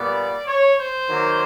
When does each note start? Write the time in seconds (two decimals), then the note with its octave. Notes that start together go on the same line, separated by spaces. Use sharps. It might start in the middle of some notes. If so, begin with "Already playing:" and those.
Already playing: A#2 G3 B3 D5
0.48 C#5
0.79 C5
1.09 D#3 F#3 A#3